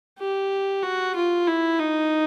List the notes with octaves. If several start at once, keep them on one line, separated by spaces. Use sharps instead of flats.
G4
F#4
F4
E4
D#4